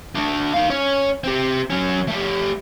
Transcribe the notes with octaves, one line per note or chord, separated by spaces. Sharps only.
A3 D4
D#4 F5
C#4 C#5
C4 G4
F#3 C#4
A3 G4